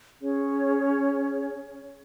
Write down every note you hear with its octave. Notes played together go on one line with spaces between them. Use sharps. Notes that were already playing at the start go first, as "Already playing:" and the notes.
C#4 G#4 C#5